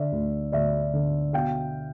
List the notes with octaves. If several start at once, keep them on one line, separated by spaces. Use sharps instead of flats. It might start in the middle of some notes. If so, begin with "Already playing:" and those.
Already playing: D3 D5 E5
D2
D2 D5 E5
D3
B2 F5 G5